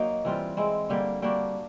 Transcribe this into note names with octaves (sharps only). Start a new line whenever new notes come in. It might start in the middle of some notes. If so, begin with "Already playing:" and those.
Already playing: F#3 A#3 D#4
E3 G3 C4 F4
G#3 C4 E4
D3 G3 A#3
G3 A#3 D4 F#4